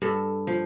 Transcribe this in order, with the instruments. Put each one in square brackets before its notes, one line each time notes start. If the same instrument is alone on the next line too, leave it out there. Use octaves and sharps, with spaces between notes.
[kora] G2 A4
F3